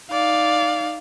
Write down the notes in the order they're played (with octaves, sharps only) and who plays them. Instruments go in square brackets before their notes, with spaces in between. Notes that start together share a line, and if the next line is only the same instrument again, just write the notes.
[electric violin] D#4 F5 [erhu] D5